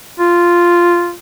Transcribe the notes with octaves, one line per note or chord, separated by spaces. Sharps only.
F4